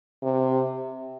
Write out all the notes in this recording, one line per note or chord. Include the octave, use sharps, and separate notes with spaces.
C3